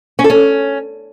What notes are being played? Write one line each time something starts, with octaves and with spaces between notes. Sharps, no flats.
C#4
A4
C#4